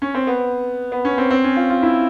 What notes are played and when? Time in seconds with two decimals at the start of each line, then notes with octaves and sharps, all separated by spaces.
0.02 C#4
0.14 C4
0.27 B3
0.92 B3
1.05 C#4
1.18 C4
1.30 C4
1.44 C#4
1.56 F4
1.70 F4
1.83 E4